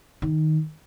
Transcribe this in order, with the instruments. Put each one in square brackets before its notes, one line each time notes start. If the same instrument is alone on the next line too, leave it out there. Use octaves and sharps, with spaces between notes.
[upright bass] D#3